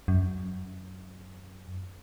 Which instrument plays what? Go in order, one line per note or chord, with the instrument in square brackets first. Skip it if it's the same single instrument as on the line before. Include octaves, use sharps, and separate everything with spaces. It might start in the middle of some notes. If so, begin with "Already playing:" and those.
[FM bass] F#2